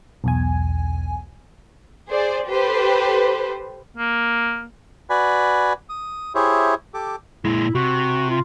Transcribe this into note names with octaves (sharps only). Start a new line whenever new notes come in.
B1 E2 G#5
G#4 C5 D5
G4 A4 B4 C5
A#3
F#4 B4 D5 G#5 B5
D#6
E4 G4 G#4 C5 C#5 E5
G4 A4 D6
A#2 G#3 E4
C3 F#4
F4